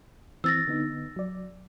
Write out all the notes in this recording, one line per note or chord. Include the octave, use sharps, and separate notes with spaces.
E3 C4 E6 A6 A#6
D3 B3 D#4
F#3 D5